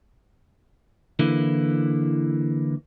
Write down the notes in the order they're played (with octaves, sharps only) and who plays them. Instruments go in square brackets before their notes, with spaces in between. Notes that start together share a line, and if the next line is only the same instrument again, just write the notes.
[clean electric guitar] D3 E3 A#3 E4